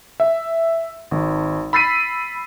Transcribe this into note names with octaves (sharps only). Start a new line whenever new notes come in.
E5
G#1
B5 E6 A6 B6 C7 D#7